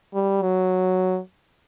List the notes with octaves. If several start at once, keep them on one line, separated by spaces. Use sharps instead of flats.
G3
F#3